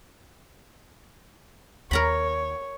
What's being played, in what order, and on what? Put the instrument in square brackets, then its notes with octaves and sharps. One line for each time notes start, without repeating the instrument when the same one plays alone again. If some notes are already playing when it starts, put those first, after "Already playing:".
[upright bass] D#2 [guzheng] A#4 A#5 B5 [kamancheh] C#5